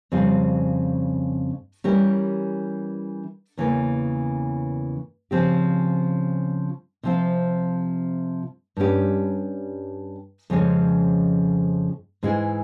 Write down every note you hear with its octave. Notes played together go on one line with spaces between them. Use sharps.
F2 C#3 G3 C4 F4
E3 G3 C#4 G4 A#4
E2 C#3 E3 A#3
C#3 F3 C4 G4
C3 F3 C4 F4
G2 G3 C#4 G4
F2 C#3 F3 G#3 C#4
G#2 E3 G#3 E4 G#4